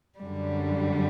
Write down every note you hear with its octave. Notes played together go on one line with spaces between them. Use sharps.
F#2 D3 G3